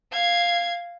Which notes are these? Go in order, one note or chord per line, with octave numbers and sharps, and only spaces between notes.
F5 G#6